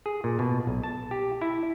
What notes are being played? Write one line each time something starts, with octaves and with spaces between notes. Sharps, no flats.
G#4
A#2
B2
B1
A5
G4
E4